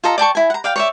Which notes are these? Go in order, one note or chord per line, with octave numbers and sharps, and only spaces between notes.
F4 A4 D#5 A#5
D5 G5 A5 C#6
E4 G#5
F#5 A#5
D5 F5 G5
C#5 D5 E5